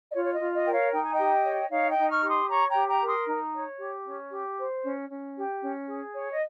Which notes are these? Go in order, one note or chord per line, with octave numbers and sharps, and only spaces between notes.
D#5
F4 C#5
C#5
D#5
F4
D#5
A#4 G5
C#5 F5
D#4 G5
G#5
D#5 G5
G4
C#5
D#4 C#5 F5
D#5 G5
D#4
C#6 F6
G4 C#6
C6 D#6
C#5 A#5 C#6
G5 A#5
G4
G5 A#5
A#4
C6 D#6
D#4
C#5
G4
C#4
G4
C5
C#4
C#4
G4
C#4
G#4
C#5
D#5